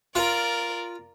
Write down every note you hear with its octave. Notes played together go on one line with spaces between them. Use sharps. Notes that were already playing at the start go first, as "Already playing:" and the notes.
F4 A#4 D5